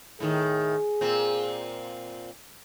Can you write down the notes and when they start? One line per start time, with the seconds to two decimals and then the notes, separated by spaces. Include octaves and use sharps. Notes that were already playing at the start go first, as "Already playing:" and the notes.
0.20 A2 D#3 G#4
1.01 A#2 C4